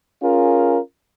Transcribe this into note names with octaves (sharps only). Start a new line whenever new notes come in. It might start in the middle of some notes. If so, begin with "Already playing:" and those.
C#4 F4 G#4 A#4